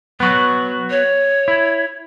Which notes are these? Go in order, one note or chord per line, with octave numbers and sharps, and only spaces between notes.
F#3 B3 F#4
C#5
E4